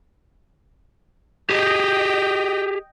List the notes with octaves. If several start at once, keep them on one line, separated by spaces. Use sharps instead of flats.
G4 G#4 D#5 G5